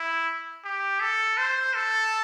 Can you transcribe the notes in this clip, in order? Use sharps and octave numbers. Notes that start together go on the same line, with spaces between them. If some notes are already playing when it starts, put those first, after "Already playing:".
Already playing: E4
G4
A4
C5
A4